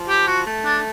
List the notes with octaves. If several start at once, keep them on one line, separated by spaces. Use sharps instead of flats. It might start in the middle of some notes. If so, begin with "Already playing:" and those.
Already playing: F3
G4
F#4
A3
D4